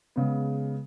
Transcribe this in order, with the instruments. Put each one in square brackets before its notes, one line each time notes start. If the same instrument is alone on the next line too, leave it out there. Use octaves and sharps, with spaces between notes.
[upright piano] C#3 G#3 B3